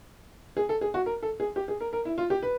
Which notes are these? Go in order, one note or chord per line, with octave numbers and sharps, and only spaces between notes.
G#4
A4
G#4
F#4
A#4
A4
G#4
G4
G#4
A#4
A#4
E4
F4
G4
B4